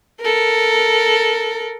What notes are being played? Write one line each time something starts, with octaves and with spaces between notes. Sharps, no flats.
A4 A#4